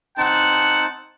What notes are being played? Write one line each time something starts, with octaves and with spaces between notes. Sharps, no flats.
C4 D#4 F#5 A5